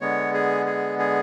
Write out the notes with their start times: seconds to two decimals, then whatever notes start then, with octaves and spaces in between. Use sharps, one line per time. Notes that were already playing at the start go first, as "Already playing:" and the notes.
0.01 D3 G#3 B3 C#5
0.34 G#4
0.66 G#4
0.99 G#4